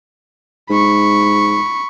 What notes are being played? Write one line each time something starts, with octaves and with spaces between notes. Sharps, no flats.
G#2 B5 C#6